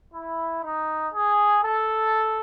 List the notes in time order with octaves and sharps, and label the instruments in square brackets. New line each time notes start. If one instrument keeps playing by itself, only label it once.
[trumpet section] E4
D#4
G#4
A4